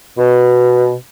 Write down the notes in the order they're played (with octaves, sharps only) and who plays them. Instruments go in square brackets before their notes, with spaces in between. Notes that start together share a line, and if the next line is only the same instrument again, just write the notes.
[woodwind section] B2